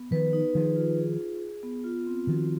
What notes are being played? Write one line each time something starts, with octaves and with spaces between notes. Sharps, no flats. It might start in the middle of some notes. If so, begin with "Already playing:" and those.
Already playing: B3
D#3 F3 B4
D#4
D#3 F3 G#4
F4
G#4
G#4
G#4
B3
F4
C4
D#3 F3 F#4